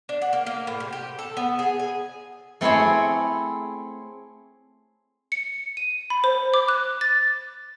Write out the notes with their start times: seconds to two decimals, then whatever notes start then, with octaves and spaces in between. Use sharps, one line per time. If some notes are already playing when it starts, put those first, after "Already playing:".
0.09 D4
0.22 F#5
0.33 A#3
0.47 A#3
0.67 A2
0.80 C3
0.93 G4
1.19 A4
1.37 B3
1.59 G#4
1.79 G#5
2.61 A3 C4 E4 G#4 C#5
5.32 C#7
5.77 D#7
6.10 B5
6.24 C5
6.54 D6
6.68 F#6
7.01 A6